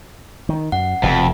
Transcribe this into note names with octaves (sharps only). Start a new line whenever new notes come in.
D#3
F#2 F#5
F1 F2 B2